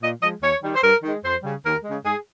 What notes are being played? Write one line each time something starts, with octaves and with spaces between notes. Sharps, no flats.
A#2 D#5
F3 G#3 D#5
D#2 C#5
D#3 G3
C5
G2 A#4
D#3 G#3
F2 C5
C#3 G3
D#2 A#4
C#3 G#3
G#2 G#4